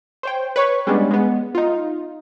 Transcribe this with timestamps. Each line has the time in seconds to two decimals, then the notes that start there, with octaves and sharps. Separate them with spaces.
0.23 C5 C#5 G5
0.56 B4 C#5 C#6
0.87 G3 G#3 B3 C#4 D4
1.11 G#3 B3
1.55 D#4 F4